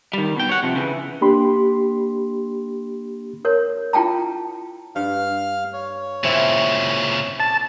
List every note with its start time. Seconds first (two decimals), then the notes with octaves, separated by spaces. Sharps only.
0.13 D#3 G3
0.36 B2 G5
0.49 C#5 F#5
0.63 C3 F3
0.76 C#3 E3
1.21 A#3 D4 G4 B5 C6
3.45 A#4 C#5
3.93 E4 F4 G5 A5 A#5
4.96 G2 F5 F6
5.73 C#5
6.24 A#2 C#3 C4 E4
7.40 A5